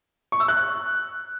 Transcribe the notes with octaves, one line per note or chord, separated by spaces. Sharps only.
C#6
E6
F#6